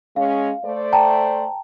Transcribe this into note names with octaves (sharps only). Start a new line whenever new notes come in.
G#3 C#4 F5
A3 C5 D5
G5 A5 A#5